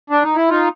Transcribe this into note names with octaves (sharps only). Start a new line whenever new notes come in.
D4
D#4
E4
D#4 F4